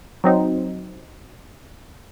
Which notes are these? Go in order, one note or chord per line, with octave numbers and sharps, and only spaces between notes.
F#3 C4 D#4